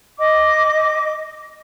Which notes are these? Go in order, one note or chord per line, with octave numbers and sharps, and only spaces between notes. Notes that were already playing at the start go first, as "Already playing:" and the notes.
D#5 D6